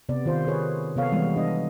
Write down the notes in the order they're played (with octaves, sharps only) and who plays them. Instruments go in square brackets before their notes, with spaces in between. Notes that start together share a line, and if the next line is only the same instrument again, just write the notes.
[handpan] C3 B3 D5
D#3 F4 C5
G#4 B4 C#5
C3 B3 A4 C#5 F5
E3 G3 G#3 B3
D4 D#5